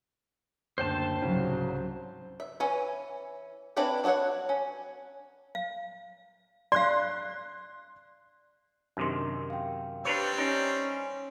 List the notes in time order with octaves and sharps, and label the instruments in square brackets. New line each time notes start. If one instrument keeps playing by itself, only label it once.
[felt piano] F#1 D2 [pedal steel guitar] C5 G5 A5
[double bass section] C2 F#3 [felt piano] G#2 C#3
[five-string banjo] E5
E3 C#4 C#5
C4 D4 E4 B4 C#5
D4 F#4 C5 C#5 F#5
C#4
[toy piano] F5
[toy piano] D5 F5 [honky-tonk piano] C6 F#6
[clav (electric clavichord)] F#2 C3 D#3 [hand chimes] D4 C6
[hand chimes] F5 G5
[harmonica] G3 C4 [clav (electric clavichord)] D4 B4 C#5
[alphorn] C#4 [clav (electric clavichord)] D#4 [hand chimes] C7 D7